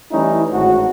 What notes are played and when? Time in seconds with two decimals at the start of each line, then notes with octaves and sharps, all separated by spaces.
0.12 E3 G3 A3 C#4 D#4 E4
0.52 G#1 A2 F#4